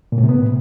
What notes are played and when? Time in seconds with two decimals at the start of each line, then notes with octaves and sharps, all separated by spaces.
0.12 A#2
0.18 A2
0.23 C3
0.29 B3